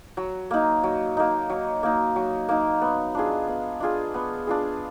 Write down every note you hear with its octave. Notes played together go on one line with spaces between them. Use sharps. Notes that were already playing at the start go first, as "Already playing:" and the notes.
F#3
A#3 D#4
F#3
A#3 D#4
F#3
A#3 D#4
F#3
A#3 D#4
B3
D4 F4 G#4
B3
D4 F4 G#4
B3
D4 F4 G#4